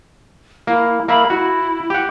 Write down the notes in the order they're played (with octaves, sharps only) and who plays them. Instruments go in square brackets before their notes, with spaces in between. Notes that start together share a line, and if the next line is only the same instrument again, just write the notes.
[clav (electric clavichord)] A#3 [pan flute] E4
[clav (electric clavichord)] A#3 E5 [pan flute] B5
[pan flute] E4 [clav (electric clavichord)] F#4
[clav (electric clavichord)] G4 F#5